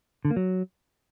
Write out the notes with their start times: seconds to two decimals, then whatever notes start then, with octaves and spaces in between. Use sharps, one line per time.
0.25 D3
0.31 A#3
0.36 F#3